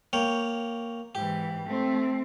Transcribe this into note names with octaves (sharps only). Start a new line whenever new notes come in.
A#3 C#5 G5
G#2 E3 G4
A3 C4